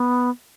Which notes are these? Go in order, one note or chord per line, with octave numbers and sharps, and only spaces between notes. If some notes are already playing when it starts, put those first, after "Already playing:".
Already playing: B3